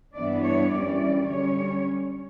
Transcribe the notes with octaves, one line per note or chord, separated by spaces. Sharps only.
G2 E3 B3 D4 D5
C#5
F#2 E3 G3 C#4 D5
D3 G3 C#4 C#5